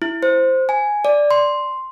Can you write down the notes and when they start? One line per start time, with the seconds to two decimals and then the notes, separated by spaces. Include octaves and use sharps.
0.02 E4
0.23 C5
0.69 G#5
1.05 D5
1.31 C6